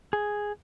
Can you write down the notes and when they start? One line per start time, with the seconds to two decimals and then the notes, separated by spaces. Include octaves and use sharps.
0.13 G#4